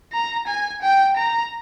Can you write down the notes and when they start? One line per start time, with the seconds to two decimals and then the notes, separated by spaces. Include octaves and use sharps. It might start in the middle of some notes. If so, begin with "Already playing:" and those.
0.13 A#5
0.47 G#5
0.82 G5
1.16 A#5